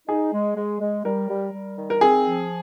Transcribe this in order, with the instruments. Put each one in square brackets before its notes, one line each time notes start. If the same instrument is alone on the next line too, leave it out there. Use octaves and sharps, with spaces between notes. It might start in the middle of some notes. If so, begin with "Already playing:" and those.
[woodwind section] D#4 [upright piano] G#4
[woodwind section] G#3
G#3
G#3
[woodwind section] G3 [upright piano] A#4
[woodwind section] G3
G3
D#3
[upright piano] A#4
[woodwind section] C4 [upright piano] G#4
[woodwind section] F3